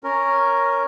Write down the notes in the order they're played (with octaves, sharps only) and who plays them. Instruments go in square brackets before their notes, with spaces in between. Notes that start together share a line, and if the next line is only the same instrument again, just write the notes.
[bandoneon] C#4 A#4